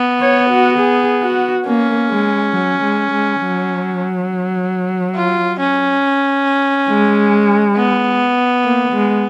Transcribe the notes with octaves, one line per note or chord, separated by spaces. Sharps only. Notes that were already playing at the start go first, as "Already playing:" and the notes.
Already playing: B3
C#5
F#4
G#4
F#4
A#3 C#4
G#3
F#3
G#3
G#3
F#3
F4
C#4
G#3
B3
A#3
G#3